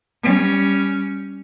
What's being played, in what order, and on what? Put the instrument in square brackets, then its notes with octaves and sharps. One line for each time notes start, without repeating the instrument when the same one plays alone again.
[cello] G3 C#4